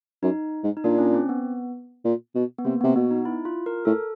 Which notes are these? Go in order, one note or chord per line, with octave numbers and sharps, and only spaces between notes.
F#2 D#4
G#2
D#4
A#2 D4
C#4
C4
B3
A#2
B2
B3
C3 A#3
B3
C3
B2 B3
D#4
E4
F4
A#4
A2 A4